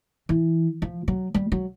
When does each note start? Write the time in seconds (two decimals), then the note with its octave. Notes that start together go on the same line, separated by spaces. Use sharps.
0.29 E3
0.82 F3
1.08 F#3
1.34 G3
1.52 F#3